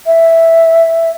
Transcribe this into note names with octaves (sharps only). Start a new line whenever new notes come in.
E5